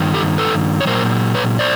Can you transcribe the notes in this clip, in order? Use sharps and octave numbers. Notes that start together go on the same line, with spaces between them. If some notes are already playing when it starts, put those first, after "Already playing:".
Already playing: G2 D#3
G4 A4
A4 B4
C#5
A#2 F#3 A#4 C5
B4 C#5
C5 D5